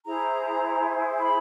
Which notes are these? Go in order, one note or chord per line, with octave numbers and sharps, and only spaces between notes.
E4 G#4 C5 A#5
B5